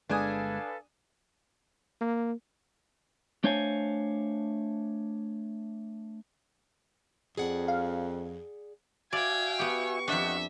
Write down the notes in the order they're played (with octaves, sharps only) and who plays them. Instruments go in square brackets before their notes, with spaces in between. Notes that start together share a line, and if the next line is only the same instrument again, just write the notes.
[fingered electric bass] G1 G#3 [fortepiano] D4 G#5 D#6 [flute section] A4 B4 F5
[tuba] A#3
[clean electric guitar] A3 D4 C5 C#5 F5 G#5
[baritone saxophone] F2 [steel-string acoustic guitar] G#4 D5 F#5
[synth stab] F5
[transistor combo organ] F#4 E5 G#5 [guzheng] D5 [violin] F5 G5 [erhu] G#6
[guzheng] B3 G4 [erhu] C#6
[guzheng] F2 D4 [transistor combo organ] G4 D#5 F#5 [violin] E5